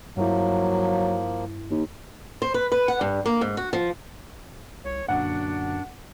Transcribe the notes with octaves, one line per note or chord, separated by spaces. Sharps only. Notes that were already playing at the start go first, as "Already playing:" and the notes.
G2 F3 F#3 A#3 E4
D#2
C5
B4
B4
F#5
G2
A#3
G#2
F#4
F3
C2 C#5
F#2 A#2 D3 F#3 D4 F#5